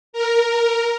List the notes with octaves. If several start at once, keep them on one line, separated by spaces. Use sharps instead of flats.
A#4